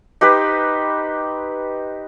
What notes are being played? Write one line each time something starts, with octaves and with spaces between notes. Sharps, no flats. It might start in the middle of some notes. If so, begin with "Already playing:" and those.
D#4 G4 B4 C5